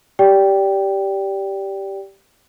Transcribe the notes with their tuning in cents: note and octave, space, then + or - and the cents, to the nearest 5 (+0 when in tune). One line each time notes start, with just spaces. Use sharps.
G4 -5 D5 -20 G5 +0